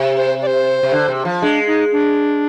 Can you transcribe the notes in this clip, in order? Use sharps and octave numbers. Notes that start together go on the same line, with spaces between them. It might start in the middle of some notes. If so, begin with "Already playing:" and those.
Already playing: C3
C5
D5
C5
C3
D3
C3
F3
G#3 D4
D#4
D4